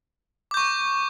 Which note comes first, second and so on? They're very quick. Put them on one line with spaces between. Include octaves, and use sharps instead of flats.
D6 G6 C#6